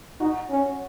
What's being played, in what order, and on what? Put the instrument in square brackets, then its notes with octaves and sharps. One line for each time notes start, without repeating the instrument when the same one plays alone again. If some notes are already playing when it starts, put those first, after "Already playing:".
[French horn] D#4 [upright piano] F#4
[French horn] C#4